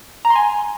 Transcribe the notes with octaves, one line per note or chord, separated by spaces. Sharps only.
A#5
C6
G#5